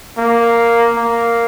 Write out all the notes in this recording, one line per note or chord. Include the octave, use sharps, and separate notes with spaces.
A#3
A#3